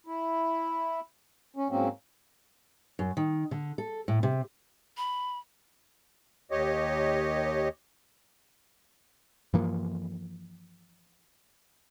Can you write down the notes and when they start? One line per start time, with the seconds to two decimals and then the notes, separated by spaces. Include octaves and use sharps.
0.07 E4
1.56 C#4
1.69 G#2 F#3 A#3 C4 C#4
2.99 F#2
3.17 D#3
3.51 D3
3.78 A4
4.08 A2
4.23 C3
4.97 B5
6.51 D#2 G4 C#5 D#5
9.53 G2 E3 F3 A#3